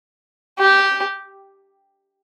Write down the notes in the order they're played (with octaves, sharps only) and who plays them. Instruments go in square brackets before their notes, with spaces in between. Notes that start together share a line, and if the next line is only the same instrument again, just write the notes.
[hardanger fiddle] G4